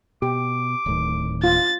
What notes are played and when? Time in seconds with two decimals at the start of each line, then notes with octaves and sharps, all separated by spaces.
0.22 B2 G4 D6
0.86 D1 A2 D#3
1.44 F4 A6